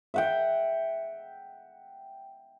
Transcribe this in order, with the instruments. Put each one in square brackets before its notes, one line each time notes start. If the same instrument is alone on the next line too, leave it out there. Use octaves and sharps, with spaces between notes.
[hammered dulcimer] E5 F#5 G5